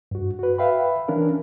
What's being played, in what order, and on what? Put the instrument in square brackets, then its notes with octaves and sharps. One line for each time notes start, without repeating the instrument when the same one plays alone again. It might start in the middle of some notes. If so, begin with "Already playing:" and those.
[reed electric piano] G2 F#4
F#4 B4
B4 E5 F5 G5 B5
E3 C#4 D4 A#4